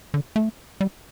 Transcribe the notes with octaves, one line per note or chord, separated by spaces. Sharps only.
D3
A3
G3